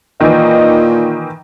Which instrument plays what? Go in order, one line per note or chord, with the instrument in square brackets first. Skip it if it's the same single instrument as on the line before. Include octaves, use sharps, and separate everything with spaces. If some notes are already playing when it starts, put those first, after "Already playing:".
[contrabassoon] A#2 [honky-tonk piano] D#3 E3 [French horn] D#5